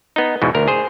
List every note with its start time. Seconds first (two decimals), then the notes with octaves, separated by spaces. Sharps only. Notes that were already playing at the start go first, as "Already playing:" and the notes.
0.16 B3 D#4
0.42 E2 G#2 B2
0.55 D2 A#4
0.68 G#4 C5